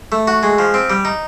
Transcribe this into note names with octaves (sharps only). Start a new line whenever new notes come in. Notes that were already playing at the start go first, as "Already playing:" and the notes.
A3
F#4
G#3
F3
C4
G3
D#4